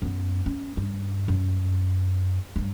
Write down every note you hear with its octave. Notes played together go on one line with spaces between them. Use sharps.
F#2 B3
C#4
G2
F#2
G2 F#3